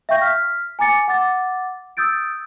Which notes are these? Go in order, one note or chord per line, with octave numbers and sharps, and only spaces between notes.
E5 F5 G5 C#6 G6 A#6
F6 B6
G#5 A#5 D6 A6 C#7
F#5 D6 A6
D#6 E6 G6 A6 D7